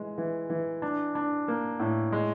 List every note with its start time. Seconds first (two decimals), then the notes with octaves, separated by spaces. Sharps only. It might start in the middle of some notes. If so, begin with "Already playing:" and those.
Already playing: E3 G#3
0.18 E3
0.50 E3
0.82 D4
1.15 D4
1.48 A#3
1.80 A2
2.12 G#3